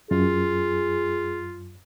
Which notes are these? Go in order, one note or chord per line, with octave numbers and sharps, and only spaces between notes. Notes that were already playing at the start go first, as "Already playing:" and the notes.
F#2 F4 G#4